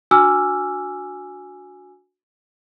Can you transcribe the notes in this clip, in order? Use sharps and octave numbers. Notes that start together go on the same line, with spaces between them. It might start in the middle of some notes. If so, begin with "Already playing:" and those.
D4 F#4 G#5 D6 E6 F6